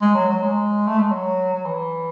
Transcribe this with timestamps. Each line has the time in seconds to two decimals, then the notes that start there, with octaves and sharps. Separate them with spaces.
0.01 G#3
0.15 F#3
0.29 F#3
0.42 G#3
0.88 A3
0.99 G#3
1.11 F#3
1.54 F#3
1.65 E3